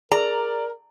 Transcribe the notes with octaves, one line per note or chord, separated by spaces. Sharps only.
G#4 A#4 D5 A#5